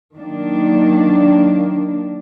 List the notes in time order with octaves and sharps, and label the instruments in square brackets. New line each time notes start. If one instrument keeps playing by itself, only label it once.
[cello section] D#3 F#3 A#3 D4